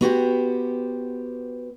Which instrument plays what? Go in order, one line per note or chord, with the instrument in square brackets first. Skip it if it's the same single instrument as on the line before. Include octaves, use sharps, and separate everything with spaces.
[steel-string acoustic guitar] B3 F#4 G4 C5